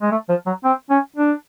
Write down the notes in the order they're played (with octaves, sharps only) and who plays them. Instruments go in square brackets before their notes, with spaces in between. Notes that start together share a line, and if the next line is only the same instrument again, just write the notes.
[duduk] G#3
A3
F3
F#3
C4
C#4
D4